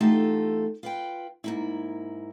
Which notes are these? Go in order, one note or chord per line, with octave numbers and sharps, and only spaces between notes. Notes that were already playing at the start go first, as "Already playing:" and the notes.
E2 A3 D#4 F4 G4 A4
F4 B4 G5
G#2 A#3 E4